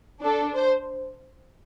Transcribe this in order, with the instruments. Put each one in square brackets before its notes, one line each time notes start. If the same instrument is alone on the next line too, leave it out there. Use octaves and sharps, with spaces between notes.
[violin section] D4 A4
C5